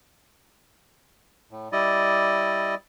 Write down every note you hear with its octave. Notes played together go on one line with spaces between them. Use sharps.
A2
G3 E4 D5 D#5